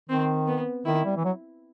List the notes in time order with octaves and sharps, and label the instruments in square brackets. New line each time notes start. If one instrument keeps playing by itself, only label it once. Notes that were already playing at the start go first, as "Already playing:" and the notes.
[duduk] D#3 [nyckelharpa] C4
[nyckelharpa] B3
[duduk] D#3 [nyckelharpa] E4
[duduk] G3
E3
F#3